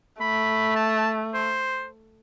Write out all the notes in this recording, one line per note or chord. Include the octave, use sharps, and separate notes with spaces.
A3 B5
A5
C5